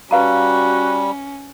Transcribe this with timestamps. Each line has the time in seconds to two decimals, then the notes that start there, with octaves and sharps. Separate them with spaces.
0.11 G3 C#4 F#4 B4 F5 A#5